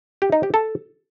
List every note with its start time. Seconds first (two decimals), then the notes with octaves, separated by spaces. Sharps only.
0.22 G4
0.32 D#4
0.43 G4
0.54 A4